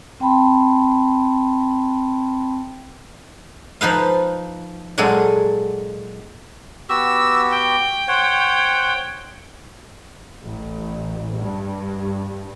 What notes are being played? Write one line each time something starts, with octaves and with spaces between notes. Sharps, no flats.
C4 G5 A5 B5 C6
F3 D#4 B4 F5
A#2 F#3 G#3 A4
B3 F#4 G4 E6
G5
C5 C#5 F#5
A1
G2